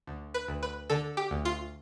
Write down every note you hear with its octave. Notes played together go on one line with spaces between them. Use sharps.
D2
B4
D2
B4
D3 A4
G4
D2
F4